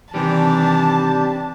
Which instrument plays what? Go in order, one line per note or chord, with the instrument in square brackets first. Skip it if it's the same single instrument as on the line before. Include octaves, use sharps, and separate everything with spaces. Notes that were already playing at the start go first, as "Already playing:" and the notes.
[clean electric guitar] C3 D#3 G3 [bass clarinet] E3 [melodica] D4 G4 [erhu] A5